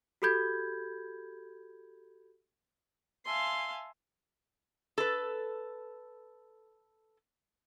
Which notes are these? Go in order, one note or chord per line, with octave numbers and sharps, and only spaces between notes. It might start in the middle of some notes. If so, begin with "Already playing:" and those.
F#4 G4 A4 B5 G6 G#6
E5 F5 G#5 A5 C6
A4 B4